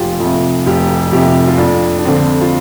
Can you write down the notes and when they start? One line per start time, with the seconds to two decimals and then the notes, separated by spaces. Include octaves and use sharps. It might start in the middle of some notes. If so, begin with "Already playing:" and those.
Already playing: F1 F4 G4
0.20 F2
0.25 C3
0.66 F1 G4
1.12 F2 C3 G4
1.48 F4
1.58 F2 D4
1.99 D4
2.05 D3 F3 C4
2.41 F4